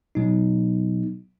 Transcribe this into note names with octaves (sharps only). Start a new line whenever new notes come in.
B2 F#3 B3 D#4